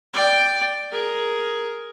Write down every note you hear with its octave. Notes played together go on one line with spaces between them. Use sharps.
D5 G5
G#4 A#4